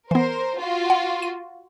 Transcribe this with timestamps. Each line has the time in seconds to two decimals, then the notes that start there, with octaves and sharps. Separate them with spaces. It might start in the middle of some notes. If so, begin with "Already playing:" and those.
0.11 E3 B3 A#4 C5
0.58 F4 F#4
0.90 F#5
1.22 D#7